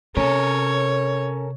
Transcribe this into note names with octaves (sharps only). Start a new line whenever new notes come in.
C3 C#4 A4 A#4 C#5